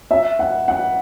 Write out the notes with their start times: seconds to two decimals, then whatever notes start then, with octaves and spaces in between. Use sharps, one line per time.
0.11 E5
0.39 F#5
0.68 F#5